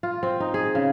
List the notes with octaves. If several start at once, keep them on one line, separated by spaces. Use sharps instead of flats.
F4
C4
D#4
G#4
C#3